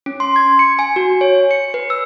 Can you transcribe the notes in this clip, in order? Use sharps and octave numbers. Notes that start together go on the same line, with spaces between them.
C#4
C6
G#6
C#7
G#5
F#4
C#5
C#7
B4
E6